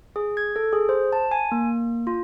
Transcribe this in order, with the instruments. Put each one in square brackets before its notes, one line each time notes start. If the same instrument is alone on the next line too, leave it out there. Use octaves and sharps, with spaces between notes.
[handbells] G#4
G#6
A4
G#4
C5
A5
G#5
A#3
F4